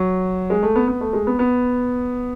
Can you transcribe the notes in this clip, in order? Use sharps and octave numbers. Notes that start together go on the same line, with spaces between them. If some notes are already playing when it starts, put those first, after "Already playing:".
Already playing: F#3
G#3
A3
B3
B3
A3
G#3
B3
B3